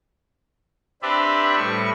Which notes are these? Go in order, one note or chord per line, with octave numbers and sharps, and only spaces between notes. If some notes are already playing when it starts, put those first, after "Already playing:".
C4 D4 G4 B4 D5 E5
A2 G3 C#6